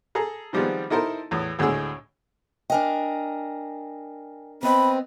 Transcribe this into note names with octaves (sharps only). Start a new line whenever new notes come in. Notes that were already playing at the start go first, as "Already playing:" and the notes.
G#4 A4 A#5
D#3 F3 G3 G#3 B3 C4
D#4 E4 A4 A#4 C5
E2 A2
D2 A2 D3 G#3 G#4 E6
D4 A#4 D#5 G5 G#5
B3 C4 D#5 B5